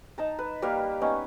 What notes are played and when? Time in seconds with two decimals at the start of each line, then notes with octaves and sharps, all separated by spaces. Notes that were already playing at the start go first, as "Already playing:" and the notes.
0.18 D#4 A5 A#5
0.39 B4
0.62 G3 A#3 B4 F5
1.01 B3 C#4 D#4